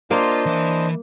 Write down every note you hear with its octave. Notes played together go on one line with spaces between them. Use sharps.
A#3 D4 F4 C5 D#5 C6
E3 E5